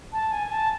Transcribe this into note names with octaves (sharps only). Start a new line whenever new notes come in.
A5
G#5
A5